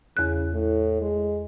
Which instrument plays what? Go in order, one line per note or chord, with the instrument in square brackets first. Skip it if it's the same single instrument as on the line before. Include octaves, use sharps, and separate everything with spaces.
[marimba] E2 F#6 [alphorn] C#3
[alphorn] A2
G#3